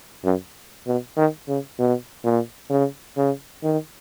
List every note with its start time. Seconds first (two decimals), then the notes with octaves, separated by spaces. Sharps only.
0.25 F#2
0.87 B2
1.17 D#3
1.49 C#3
1.79 B2
2.25 A#2
2.70 C#3
3.17 C#3
3.63 D#3